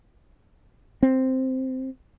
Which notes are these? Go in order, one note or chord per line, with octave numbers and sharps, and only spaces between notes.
C4